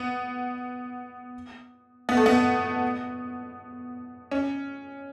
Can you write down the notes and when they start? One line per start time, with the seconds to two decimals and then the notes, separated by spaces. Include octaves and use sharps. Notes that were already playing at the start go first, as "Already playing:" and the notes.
Already playing: B3
2.09 B3
2.17 A3
2.26 B3
4.31 C#4